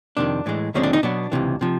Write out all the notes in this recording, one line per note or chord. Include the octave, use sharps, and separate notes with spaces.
F2 C3 D#3 D4
A2 E3 G#3
D#2 D3 F3 G#3 C4 C#4
D4
D#4
B2 F#3 B3 D4
C#2 C3 E3
C3 F3